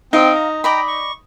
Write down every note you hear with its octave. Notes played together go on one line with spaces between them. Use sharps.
C4 D#4 F5 G5
A#5
D5 D#5 G5 A#5 B5
C#6